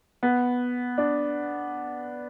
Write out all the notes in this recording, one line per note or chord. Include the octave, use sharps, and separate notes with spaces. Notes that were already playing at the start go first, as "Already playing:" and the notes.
B3
D4